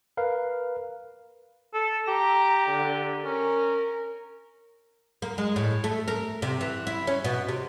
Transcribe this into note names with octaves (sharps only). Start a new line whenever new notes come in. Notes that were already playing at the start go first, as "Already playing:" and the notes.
A#4 B4 F5
A4
G4 A#5
D3
C#4 A#4
A#3
G#3
A2
A3
A#4
C3
E3
E4
C#4
B2
C3